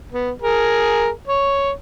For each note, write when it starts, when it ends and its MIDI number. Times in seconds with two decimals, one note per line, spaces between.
0.12 0.31 59
0.42 1.09 68
0.42 1.09 70
1.28 1.71 73